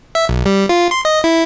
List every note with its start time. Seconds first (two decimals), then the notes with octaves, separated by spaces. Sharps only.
0.15 E5
0.29 B1
0.46 G3
0.69 F4
0.91 C6
1.05 D#5
1.24 E4